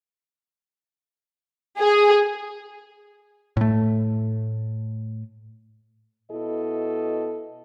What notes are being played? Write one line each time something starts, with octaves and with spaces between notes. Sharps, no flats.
G#4
A2 A3
B2 E4 A4 D#5